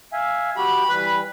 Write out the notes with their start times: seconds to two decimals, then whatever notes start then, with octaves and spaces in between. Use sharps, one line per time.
0.13 E5 F5 G#5
0.57 F#4 G4 B5
0.90 E3 G3 B4